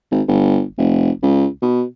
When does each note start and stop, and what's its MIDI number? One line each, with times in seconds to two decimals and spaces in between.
0.11 0.22 32
0.28 0.63 31
0.78 1.11 29
1.22 1.46 37
1.62 1.83 47